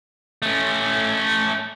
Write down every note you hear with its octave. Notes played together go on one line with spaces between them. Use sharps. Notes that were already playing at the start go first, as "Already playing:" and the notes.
A3 C#4